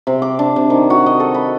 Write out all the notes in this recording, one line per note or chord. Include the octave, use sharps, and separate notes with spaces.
C3
D6
D4
C3
D#3
F#4
D#5
A4
B5